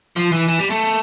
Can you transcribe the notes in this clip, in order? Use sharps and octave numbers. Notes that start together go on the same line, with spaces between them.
F3
E3
E3
G3
A3